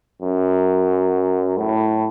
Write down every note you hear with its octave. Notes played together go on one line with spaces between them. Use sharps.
F#2
A2